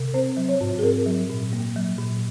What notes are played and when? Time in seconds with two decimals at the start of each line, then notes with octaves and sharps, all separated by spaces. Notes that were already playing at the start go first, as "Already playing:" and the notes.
Already playing: C3
0.14 C4 C5
0.37 F#3
0.49 C#5
0.61 G#2
0.79 G#4
0.83 C4 A#4
1.06 F#3
1.30 A#2
1.53 A#3
1.76 F#3
1.99 A#2